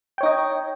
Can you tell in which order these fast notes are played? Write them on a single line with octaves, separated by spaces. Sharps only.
G5 C#5 D#4 D#5